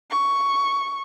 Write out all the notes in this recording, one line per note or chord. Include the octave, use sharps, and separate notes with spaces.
C#6